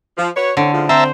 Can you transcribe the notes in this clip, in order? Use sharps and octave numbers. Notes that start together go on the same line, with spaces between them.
F3
F#4 B4 C#5
A2 D3 C4 C#5
A2 C#3 F3
C4 C5 E5 A5 A#5